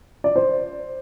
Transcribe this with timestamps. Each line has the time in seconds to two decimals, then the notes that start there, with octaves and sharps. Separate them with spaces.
0.24 D5
0.36 C5